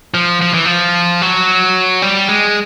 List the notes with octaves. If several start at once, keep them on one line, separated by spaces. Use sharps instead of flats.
F3
F3
E3
F3
F#3
G3
G#3